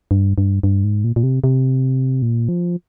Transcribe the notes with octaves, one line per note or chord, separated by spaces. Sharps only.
G2
G2
G2
G#2
A#2
A#2
C3
C3
A#2
F3